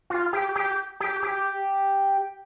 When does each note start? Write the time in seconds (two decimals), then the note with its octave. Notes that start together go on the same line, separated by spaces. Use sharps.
0.10 F4
0.33 G4
0.55 G4
1.00 G4
1.23 G4